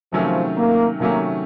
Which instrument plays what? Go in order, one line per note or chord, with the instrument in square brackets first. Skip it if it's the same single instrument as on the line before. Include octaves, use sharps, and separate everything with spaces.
[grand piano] C3 D#3 F#3 A3 C#4 [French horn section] F3
[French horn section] A#3
[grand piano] C3 D#3 F#3 A3 C#4 [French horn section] A#3